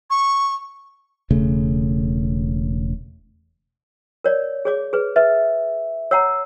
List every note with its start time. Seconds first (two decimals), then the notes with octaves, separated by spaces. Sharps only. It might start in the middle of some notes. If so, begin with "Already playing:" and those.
0.10 C#6
1.31 E1 C#3 A3
4.24 A#4 C#5 D5
4.65 G#4 C#5 D6
4.93 G#4 B4
5.16 B4 E5
6.11 C#5 F#5 A#5 E6